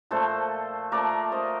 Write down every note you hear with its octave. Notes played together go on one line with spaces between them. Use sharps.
A#2 F3 A3 A4 C5
A#2 F3 A3 A#4 D5
C5 D#5